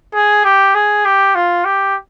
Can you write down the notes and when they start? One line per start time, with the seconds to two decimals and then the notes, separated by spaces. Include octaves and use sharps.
0.15 G#4
0.45 G4
0.75 G#4
1.05 G4
1.35 F4
1.65 G4